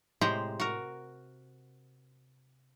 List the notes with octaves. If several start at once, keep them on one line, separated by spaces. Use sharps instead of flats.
A2 C3 G#3 G4 C5 A#5
F#4 A#4